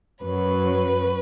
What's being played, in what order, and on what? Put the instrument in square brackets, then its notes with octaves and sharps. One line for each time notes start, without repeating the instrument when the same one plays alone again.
[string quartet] F#2 F#3 B4